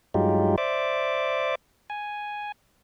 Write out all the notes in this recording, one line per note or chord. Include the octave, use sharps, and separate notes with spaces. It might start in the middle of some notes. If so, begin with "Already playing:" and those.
G2 F#3 G#3 D#4 F4 G4
C5 D5 E5 D6
G#5